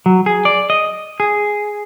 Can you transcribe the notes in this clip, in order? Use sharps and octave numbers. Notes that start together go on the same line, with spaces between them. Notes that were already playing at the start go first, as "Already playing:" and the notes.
F#3
G#4
D5
D#5
G#4